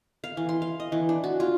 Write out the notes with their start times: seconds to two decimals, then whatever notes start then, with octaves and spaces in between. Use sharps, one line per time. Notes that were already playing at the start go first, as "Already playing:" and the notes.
0.24 F5
0.37 E3
0.49 C6
0.62 F5
0.80 D#5
0.92 E3
1.09 D4
1.24 F#4
1.40 F4